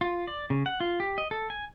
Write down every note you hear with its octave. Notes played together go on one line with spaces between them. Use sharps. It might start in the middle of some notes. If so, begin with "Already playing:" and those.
F4
D5
C#3
F#5
F4
G4
D#5
A4
G#5